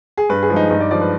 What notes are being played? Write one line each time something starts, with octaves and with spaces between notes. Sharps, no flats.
G#4
G2 B4
G#4
F3 G#3
D#4
G2 D#4
D5
F3 G#3 D5
B4